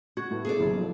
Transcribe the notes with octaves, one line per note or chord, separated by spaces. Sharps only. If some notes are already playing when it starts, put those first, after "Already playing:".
F#4 G#6
A2 A3 B3
G#4 A4 D5
F#1 G3 E4
F3 B3 D#4